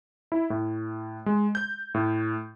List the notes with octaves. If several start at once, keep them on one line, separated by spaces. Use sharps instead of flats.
E4
A2
G#3
G6
A2